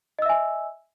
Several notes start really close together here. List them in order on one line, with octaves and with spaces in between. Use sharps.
D#5 E6 E5 G#5